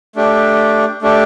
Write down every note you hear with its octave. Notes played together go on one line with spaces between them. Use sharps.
A3 D4 G4
A3 D4 G4